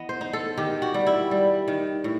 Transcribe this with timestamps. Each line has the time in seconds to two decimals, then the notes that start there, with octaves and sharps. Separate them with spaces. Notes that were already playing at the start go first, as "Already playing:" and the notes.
Already playing: E3 B3 D#5
0.09 C5
0.21 D#4
0.33 A4
0.57 D#3 G4
0.82 F#4
0.94 G3
1.07 E4
1.31 G3
1.68 D#3
2.04 A2